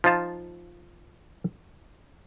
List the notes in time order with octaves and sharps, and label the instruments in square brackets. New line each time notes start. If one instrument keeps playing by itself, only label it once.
[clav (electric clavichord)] F3 D#4 F4 A5